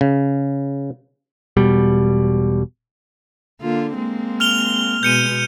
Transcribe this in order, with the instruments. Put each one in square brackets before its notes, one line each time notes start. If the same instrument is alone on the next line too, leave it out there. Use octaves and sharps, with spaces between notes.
[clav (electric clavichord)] C#3
[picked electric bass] E1 B2 G3
[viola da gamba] D3 A#3 F4
G#3 A#3 C4
[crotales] F6 F7 G7
[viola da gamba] B2 G#3 B3 [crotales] G6 C#7 D#7